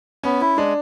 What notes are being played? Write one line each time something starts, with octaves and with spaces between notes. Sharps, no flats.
B3 C#4
E4
G#3 D4